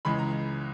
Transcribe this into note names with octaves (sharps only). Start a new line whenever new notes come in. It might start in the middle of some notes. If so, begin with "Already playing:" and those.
C#2 C#3 E3 G#3 B5
A#5